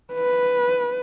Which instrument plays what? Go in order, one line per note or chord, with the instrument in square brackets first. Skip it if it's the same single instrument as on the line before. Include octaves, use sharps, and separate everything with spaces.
[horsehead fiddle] B4